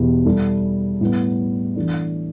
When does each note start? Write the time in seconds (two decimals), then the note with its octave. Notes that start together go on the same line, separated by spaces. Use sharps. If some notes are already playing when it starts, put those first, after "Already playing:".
Already playing: E2 B2 B3 E4 G4
0.25 G3 E4 A4
1.01 A2 G3 B3
1.76 E3 A3 D4